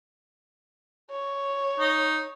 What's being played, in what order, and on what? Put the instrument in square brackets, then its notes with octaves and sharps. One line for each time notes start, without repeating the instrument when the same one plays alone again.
[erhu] C#5
[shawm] D#4